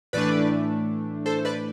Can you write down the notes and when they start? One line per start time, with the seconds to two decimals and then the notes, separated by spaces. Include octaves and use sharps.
0.13 A2 E3 A3 D4 B4 D5
1.26 A4 C5
1.45 B4 D5